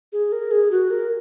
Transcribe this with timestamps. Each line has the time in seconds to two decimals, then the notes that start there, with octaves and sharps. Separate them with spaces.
0.13 G#4
0.32 A#4
0.51 G#4
0.71 F#4
0.91 A#4